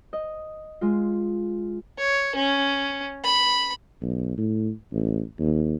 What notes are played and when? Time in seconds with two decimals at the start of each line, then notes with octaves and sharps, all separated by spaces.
0.13 D#5
0.81 G#3 F4
1.98 C#5
2.36 C#4
3.24 B5
4.02 B1
4.38 A2
4.92 A1
5.40 D#2